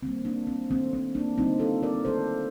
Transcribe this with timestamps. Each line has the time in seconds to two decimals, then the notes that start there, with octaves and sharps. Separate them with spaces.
0.03 D#3 G3 A#3 C4
0.25 A#3 D4
0.47 C4
0.70 D#3 A3 C4
0.93 C4
1.15 A#3 D4
1.37 D3 G3 A#3 C4 D#4
1.60 F4 A4
1.82 A#4 D5
2.05 D#3 A3 A4 C5